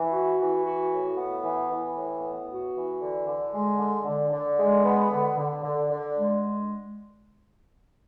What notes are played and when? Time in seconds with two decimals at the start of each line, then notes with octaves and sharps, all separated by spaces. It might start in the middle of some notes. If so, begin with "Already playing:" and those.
Already playing: E3
0.12 F#4
0.39 E3
0.65 F#4
0.92 A2
1.18 B3
1.44 E3
1.70 E3
1.96 A2
2.22 B3
2.49 F#4
2.75 E3
3.01 D3
3.27 D3
3.53 G#3
3.79 D3
4.06 D3
4.32 D3
4.59 G#3
4.84 B3
5.11 D3
5.37 D3
5.63 D3
5.90 D3
6.15 G#3